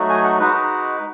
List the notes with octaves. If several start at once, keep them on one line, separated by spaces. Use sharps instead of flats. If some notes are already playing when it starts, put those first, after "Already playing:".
Already playing: F#3 A3 D#4 F#4
G#5
F#5
G#3 D#4 F#4 B4
B4